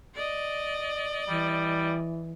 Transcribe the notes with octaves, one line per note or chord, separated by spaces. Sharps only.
D5 D#5
E3 G3